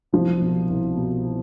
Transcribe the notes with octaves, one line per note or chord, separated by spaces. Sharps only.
C2 F3
B2
C2
B2